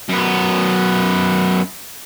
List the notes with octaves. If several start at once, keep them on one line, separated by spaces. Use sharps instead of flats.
F#2 B3